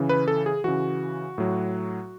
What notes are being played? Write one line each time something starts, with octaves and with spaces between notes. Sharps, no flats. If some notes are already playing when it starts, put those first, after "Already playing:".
Already playing: C#3 E3
B4
A4
G#4
C#3 E3 F#4
A2 F#3